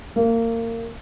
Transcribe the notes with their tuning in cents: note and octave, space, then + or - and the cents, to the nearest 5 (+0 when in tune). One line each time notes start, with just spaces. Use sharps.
A#3 -25